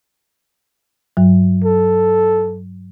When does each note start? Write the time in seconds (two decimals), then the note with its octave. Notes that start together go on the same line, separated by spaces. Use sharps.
1.17 G2 F#3
1.64 A4